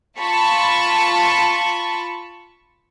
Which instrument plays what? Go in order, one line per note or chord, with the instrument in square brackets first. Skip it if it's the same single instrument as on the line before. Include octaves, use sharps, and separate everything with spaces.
[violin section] F4 A5 B5 C#6